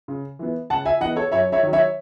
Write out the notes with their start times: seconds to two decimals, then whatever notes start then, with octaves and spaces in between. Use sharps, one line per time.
0.08 C#3
0.39 E3 B3
0.70 C#3 F#5 A5
0.85 E5 G#5
1.01 E3 D#5 F#5
1.05 B3
1.16 A4 C#5
1.32 F#2 C#5 E5
1.52 C#5 E5
1.63 D#3 F#3
1.73 C#5 E5